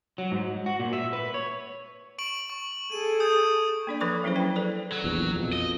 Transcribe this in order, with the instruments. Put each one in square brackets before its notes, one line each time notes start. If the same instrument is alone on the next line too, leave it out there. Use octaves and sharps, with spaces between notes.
[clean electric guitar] F#3
G#2
F#4
A#2
E5
B4
C#5
[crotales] C#6 D7 F#7
C#6
[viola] G#4 A4 [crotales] D#7
[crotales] D#6 G6
[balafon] A#3 D4 D5
F3 A4 B4 B5 C#6 D6
F#3 C#4 E4 G#4 C5
C#4 B4 G5
A4 B4 D5
[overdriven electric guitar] F#3
[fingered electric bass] A#1 E2
F2 B2
[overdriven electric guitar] D#5